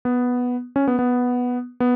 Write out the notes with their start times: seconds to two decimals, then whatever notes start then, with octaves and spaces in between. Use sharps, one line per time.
0.05 B3
0.76 C#4
0.87 B3
0.99 B3
1.80 B3